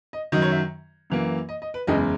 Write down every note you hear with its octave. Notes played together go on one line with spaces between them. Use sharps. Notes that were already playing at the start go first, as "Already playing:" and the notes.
D#5
F#2 D#3 F#3 D#5
C#5
E5
F#2 E3 A#3
D#5
D#5
B4
F#1 E2 C#3 G#3 D#5